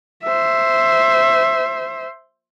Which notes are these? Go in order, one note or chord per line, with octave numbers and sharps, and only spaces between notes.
C5 E5